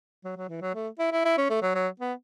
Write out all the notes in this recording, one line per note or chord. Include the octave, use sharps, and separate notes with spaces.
F#3
F#3
E3
F#3
A3
E4
E4
E4
C#4
A3
F#3
F#3
B3